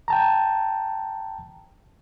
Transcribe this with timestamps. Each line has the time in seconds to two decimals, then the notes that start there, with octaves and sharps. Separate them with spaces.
0.08 G5 A5 A#5